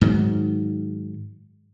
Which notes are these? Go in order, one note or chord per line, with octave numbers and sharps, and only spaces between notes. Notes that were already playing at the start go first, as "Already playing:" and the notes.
G#2 D#3 F#3